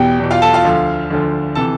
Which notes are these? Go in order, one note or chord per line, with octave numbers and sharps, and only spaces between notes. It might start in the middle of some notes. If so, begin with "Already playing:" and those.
Already playing: E2 B2 G4 G5
E2 B2
F4 F5
A4 A5
F4 F5
D2 D3 F3
D2 D3 F3
C3 E3 A4 A5